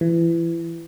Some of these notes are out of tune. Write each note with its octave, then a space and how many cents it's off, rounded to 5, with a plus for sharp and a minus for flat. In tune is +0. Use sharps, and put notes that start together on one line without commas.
E3 +25